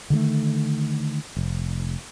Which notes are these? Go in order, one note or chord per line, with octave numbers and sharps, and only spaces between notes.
D3 D#3 G3 A3
F1